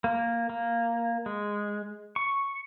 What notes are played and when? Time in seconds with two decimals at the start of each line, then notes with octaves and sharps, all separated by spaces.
0.04 A#3
0.50 A#3
1.26 G#3
2.16 C#6